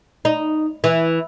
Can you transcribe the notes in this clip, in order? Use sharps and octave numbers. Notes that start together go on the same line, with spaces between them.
D#4
E3